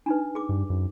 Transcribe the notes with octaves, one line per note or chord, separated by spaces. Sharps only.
D4 D#4 B4
G#4 D6
G2
F#2